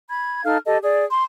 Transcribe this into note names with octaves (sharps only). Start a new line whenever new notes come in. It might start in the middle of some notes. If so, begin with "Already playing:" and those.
B5 G#6
D#4 A4 F5 F6
G4 A4 D#5
G#4 D5
C6